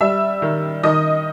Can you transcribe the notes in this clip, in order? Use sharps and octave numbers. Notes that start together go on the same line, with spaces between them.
G3 E5 E6
D#3
D#3 D#5 D#6